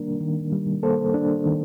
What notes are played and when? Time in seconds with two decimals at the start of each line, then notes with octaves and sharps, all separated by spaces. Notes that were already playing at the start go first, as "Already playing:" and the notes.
Already playing: D#3 G3 A#3 D4 A#4
0.20 D#3
0.52 G3
0.83 A#3 A4 C5
1.14 D4
1.46 D#3